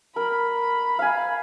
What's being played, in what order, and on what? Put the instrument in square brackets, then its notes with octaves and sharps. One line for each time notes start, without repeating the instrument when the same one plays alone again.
[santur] A#4 [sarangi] B5
[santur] F5 G#5